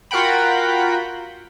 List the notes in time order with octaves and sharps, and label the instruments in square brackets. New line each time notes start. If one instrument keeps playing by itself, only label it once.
[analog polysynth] F4 F#4 A#4 F#5 G5 B5